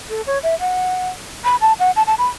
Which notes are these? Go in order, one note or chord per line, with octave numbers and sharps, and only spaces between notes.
A4
C#5
E5
F#5
B5
A5
F#5
A5
A5
B5